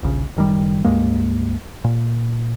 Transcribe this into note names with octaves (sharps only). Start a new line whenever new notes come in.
D#1 A#1 C#3
F#1 D#3 G3
C#2 G2 G#3 A#3
A#2